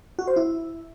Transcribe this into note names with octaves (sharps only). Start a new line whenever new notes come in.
F#4
C5
E4